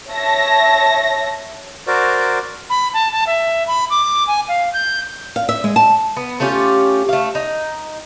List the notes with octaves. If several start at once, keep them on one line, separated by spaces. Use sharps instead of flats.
C#5 E5 A5 A#6
F#4 A#4 C5 D5
B5
A5
A5
E5
B5
D6
G#5
F5
G6
F5
E5
G#3
A5
B3
A3 C#4 F4 G4
A3 F5
D#4